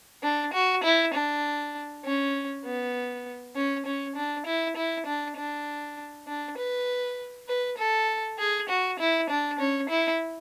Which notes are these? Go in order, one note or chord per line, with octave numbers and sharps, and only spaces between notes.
D4
F#4
E4
D4
C#4
B3
C#4
C#4
D4
E4
E4
D4
D4
D4
B4
B4
A4
G#4
F#4
E4
D4
C#4
E4